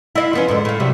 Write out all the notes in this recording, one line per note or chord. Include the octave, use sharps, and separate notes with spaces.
E4 D#5 F5
F3 B3 C#4
F2 G#2 D3
A2 F4
C3 F#3 G3